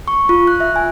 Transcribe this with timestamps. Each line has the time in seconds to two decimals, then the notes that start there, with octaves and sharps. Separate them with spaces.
0.08 C#6
0.29 F4
0.47 F#6
0.60 E5
0.76 G#5